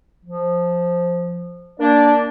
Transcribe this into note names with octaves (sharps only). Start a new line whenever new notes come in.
F3
A#3 D4 D5